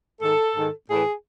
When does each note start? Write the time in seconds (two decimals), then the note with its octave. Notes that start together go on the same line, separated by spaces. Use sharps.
0.21 G#2 D#3 A4
0.55 G#2 D#3
0.89 A2 E3 G#4